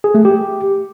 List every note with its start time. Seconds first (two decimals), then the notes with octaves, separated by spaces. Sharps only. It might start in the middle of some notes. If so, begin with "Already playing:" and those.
0.04 G#4
0.15 A3
0.25 G4